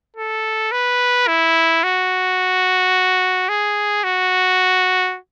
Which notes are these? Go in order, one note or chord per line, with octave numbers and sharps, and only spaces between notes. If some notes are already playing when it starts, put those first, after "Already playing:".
A4
B4
E4
F#4
G#4
F#4